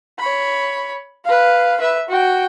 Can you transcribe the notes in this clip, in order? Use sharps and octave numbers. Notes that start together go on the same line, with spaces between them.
C#5 B5
B4 F5
B4 E5
F#4 G5